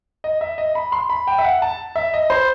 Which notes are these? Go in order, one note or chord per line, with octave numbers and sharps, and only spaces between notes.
D#5
E5
D#5
B5
C6
B5
G5
E5
F#5
A5
E5
D#5
C5